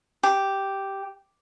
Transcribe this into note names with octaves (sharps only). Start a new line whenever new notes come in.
G4